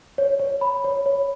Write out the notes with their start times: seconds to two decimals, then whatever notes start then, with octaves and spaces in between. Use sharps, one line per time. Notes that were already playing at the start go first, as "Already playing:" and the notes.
0.18 C#5
0.39 C#5
0.61 B5
0.84 C#5
1.06 C#5